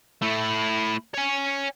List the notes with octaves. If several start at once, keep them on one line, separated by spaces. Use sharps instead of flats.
A3 E4
C#5 G#5